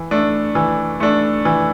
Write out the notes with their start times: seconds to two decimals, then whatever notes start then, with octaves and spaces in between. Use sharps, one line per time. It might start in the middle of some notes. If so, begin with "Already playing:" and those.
Already playing: E3
0.11 A3 D4
0.55 E3
1.00 A3 D4
1.45 E3